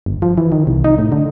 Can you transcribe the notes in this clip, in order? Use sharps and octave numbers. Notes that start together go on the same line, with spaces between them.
G1
F3
E3
D#3
C2
D#4
A2
D3